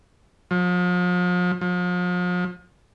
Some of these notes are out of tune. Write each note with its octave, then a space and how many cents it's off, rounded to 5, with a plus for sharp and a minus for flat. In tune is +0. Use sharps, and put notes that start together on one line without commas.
F3 +40
F3 +40